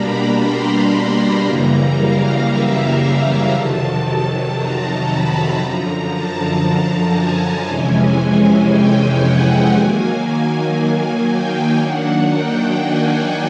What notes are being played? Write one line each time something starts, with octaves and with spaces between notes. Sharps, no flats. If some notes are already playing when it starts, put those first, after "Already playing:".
Already playing: B2 G3 A#3 D4 A#5 B5
C6
B5
F#2 C#3 E3 G3 A#3 A#5
F5
E5
F2 C3 D#3 F#3 A5
A#5
B5
F#2 D3 F3 A#5
A5
G#5
F2 C3 E3 G#3 C#4
G5
F#5
D#3 F#3 A#3 G#5
G#5
G5
D#3 F#3 A#3 D4 F#5
G5
G#5